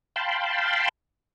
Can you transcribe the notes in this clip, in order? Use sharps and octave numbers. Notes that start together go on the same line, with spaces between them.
F5 G5 A5 B5 C6